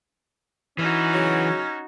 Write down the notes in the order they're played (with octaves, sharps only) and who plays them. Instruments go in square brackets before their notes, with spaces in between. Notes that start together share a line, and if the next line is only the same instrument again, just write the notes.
[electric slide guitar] E3 [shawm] C#4 [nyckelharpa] D#4 F#4
[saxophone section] C#3 F#3